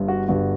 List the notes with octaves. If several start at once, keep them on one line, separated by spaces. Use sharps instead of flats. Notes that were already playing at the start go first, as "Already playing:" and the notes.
Already playing: G1 G2
F#4
G1 G2 D3 F#4